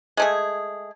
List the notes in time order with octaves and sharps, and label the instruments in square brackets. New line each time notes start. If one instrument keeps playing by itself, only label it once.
[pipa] G#3 A3 G#4